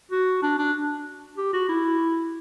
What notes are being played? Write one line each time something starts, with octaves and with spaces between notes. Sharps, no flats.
F#4
D4
D4
G4
F#4
E4